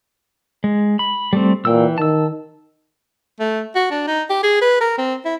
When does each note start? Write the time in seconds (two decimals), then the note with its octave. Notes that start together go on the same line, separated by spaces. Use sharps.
0.64 G#3
0.99 B5
1.33 G3 A3 C4
1.65 A#2 E3 G5 E6
1.98 D#3 A5 E6
3.40 A3
3.75 F#4
3.91 D4
4.07 D#4
4.30 G4
4.43 G#4
4.62 B4
4.81 A#4
4.98 C4
5.25 E4